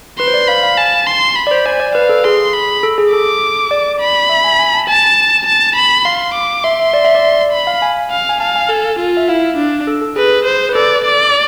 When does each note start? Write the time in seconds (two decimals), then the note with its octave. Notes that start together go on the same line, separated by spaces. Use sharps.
0.19 B4 C6
0.28 C5
0.34 D5
0.48 F5 B5
0.63 F5
0.77 G#5 A5
1.07 C6
1.36 B5
1.47 D5
1.51 C5
1.65 D5 G#5
1.80 D5
1.95 B4 F5
2.09 A4
2.24 G#4 C6
2.53 B5
2.83 A4
2.98 G#4
3.12 A4 D6
3.71 D5
4.01 B5
4.29 E5
4.44 G#5
4.59 G#5
4.74 A5
4.89 G#5 A5
5.47 A5
5.76 B5
6.05 F5 C6
6.34 D6
6.64 E5 C6
6.80 E5
6.94 D5
7.05 E5
7.15 D5
7.52 B5
7.67 F5
7.82 G#5
8.11 F5
8.29 G#5
8.40 F5 A5
8.56 G#5
8.69 A4 G#5
9.00 F4
9.17 E5
9.28 E4 F5
9.57 D4
9.87 A4
10.01 A4
10.16 G#4 B4
10.45 C5
10.69 B4
10.75 A4 D5
11.05 D5